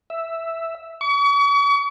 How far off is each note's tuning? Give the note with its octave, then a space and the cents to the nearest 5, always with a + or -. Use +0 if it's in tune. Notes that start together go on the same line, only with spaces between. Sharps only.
E5 +0
C#6 +40